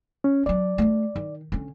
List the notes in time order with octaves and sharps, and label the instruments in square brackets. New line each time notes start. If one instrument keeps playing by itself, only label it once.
[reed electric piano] C#4
[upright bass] F#3 D4 [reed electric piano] D5
[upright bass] A3 D4
D#3
D3 C#4